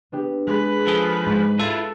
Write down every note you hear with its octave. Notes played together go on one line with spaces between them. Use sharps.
B3 D4 G4
G#3 B4
F3 G#4 A4
G#2
E4 F4 A4 A5